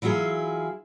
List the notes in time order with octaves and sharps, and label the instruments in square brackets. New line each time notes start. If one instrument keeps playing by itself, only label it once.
[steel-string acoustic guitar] E3 F#3 E4 F4 G#4